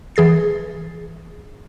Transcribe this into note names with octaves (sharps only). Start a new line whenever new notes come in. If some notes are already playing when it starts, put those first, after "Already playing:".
E3 G#4 A6 C7